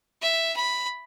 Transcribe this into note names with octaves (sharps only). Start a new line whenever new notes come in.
E5
B5